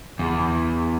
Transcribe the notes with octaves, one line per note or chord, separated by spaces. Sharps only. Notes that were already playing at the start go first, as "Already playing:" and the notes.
E2